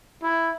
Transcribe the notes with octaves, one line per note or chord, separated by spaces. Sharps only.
E4